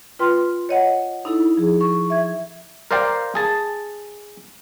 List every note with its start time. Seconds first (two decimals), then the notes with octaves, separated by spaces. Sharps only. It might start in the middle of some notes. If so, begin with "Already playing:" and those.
0.19 F4 B4 G5 C6 F6
0.69 C#5 D#5 F#5
1.25 D#4 E4 A4
1.57 F3 G#4
1.81 C#6
2.10 E5 G#6
2.91 A#4 C5 D5 F5 G5
3.35 G#4 A5